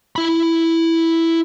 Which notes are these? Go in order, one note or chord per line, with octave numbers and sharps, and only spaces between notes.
E4 B5